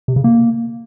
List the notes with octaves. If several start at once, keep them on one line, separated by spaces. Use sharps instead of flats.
C3
C#3
A#3